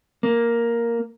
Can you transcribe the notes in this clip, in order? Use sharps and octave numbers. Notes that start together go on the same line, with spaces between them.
A#3